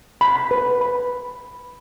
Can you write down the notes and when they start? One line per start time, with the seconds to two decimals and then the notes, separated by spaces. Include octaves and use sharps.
0.21 B5
0.51 B4
0.81 B5